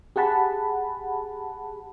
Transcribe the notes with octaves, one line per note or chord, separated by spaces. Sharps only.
G4 G#4 F#5 A5 B5